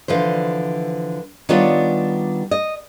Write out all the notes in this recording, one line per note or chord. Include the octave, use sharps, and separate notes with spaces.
D3 E3 F3 C5
D#3 G3 B3 D4 F4 C#5
D#5